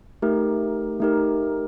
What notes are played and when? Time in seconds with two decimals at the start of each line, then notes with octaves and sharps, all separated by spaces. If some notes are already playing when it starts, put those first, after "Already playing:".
0.22 A3 D#4 G4 A#4
1.00 A3 D#4 G4 A#4